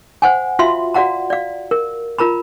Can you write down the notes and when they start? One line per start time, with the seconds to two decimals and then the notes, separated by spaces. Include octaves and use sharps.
0.22 C5 F#5 G#5
0.59 F4 F#4 E5 F5 C6
0.94 F#4 D5 F5 F#5 A#5
1.30 D5 F5
1.71 A#4
2.19 F4 A#4 A#5 B5